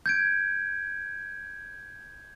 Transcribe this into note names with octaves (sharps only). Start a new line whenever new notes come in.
G6 G#6 D7